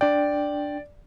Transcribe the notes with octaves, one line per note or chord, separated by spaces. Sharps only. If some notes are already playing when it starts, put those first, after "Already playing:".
D4 D5 G5